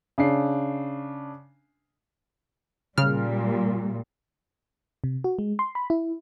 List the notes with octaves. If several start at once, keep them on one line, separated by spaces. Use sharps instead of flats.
C#3 D4 C7
A#2 C#3 G3 F6
C3
F#4
G#3
C6
B5
E4